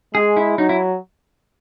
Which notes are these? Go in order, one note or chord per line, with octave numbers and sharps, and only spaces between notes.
G#3 G#4
E4
F#3 D#4
E4